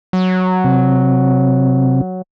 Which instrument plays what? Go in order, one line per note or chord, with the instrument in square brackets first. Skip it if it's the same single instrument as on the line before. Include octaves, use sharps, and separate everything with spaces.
[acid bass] F#3
[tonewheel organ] C3 C4